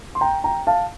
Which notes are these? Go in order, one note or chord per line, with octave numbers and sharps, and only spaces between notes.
C6
G5 A#5
G5 A#5
F5 A5